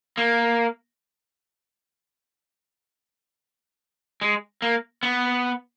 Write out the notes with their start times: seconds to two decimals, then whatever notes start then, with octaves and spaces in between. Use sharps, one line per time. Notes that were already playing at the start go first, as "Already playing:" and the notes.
0.17 A#3
4.21 G#3
4.62 A#3
5.03 B3